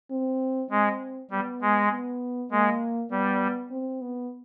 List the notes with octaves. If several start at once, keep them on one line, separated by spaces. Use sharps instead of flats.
C4
G#3 C4
G3 B3
G#3
B3
G#3 A#3
G3 B3
C4
B3